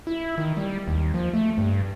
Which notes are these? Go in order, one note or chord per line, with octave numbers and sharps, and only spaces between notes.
E4
D#3
G3
D#2
F3
A3
G2